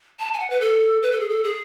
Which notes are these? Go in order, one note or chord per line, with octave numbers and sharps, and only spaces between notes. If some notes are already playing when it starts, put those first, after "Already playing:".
A5
G#5
F#5
B4
A4
B4
A4
G#4
A4
G#4